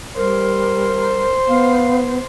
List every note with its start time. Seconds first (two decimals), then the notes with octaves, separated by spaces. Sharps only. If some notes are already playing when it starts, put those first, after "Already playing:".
0.16 G3 A#4 C5
1.48 B3 F5